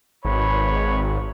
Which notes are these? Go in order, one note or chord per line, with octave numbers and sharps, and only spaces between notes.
G#1 B4 C#5 B5